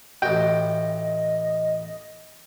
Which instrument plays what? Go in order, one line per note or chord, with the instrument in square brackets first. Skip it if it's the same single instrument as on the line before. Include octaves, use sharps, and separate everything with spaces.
[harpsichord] A1 F#4 [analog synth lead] D#5 [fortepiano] G5